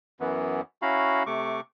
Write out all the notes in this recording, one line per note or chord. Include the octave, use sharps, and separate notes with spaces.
F#2 E3 B3
C#4 E4 F#4 F5 A#5 B5
C3 A3 C#6 D6